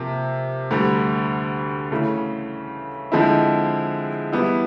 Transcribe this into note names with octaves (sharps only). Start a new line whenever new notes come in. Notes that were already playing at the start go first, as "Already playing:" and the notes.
Already playing: C3 F3 A#3
D2 D3 G3
C#3 E3 A3
D3 F3 G#3 C4 E4
E3 G3 B3 E4